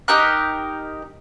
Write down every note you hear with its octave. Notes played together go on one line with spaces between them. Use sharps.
D#4 G4 A#4 F#6